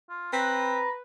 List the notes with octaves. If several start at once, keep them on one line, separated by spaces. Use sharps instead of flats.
F4
C4 B4 A#5